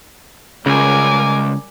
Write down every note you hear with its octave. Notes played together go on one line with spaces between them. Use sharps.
C#2 C#3 G3 A#4 G#5 D6